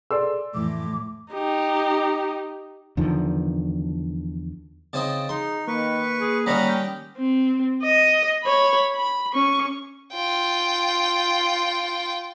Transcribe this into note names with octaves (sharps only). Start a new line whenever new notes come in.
G#4 A4 D5 C6 E6
F2 A2 E3 D6
D#4 G4
E2 D3 D#3 F3
C#3 C4 D#4 A6
D#4 G#4 C6
D#3 A#3 B4 C#6
G#4
D#3 G3 C#4 F#5 A#5 B5
G5
C4
D#5
C#5 B5
B5
C#4 C#6
F4 G5